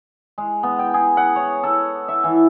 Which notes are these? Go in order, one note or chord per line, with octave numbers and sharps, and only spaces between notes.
G#3
B3
G5
G#4
F#5
C#5
A4
E5
E3